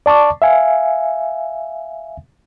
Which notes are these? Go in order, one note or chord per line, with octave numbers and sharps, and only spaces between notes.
D5 A5 C#6 D6
E5 F5 G#5